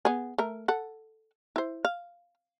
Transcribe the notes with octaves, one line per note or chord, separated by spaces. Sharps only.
B3 G#4
A3 A#4
A4 F#5
E4 C5
F5